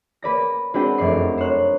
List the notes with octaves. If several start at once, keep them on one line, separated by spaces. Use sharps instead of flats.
A#3 B4 D5 A#6
G#3 C4 D4 F#4 B4 G5
F1 F#2 A3 D5 D6 C7
C5 C#5 F#6